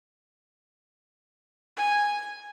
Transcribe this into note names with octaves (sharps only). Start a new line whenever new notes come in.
G#5